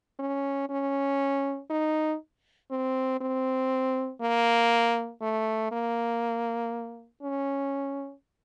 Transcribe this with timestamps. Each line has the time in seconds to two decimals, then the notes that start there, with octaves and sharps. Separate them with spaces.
0.19 C#4
0.70 C#4
1.70 D#4
2.71 C4
3.21 C4
4.21 A#3
5.22 A3
5.72 A#3
7.22 C#4